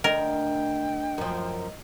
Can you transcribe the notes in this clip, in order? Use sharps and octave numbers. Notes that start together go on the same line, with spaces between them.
D2 A#4 D#5 G5
F#2 F3